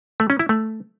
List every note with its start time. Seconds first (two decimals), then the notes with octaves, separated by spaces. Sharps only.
0.20 A3
0.30 C#4
0.39 E4
0.49 A3